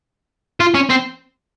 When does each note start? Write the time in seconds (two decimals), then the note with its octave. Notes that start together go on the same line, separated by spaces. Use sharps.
0.60 F4
0.74 C#4
0.89 C4